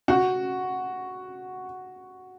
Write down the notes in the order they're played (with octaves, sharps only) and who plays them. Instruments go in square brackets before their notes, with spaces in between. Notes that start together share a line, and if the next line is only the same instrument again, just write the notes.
[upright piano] F#4